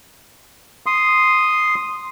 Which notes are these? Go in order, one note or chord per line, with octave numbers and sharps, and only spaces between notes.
C6 D#6